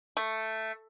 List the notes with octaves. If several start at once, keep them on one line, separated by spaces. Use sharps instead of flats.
A3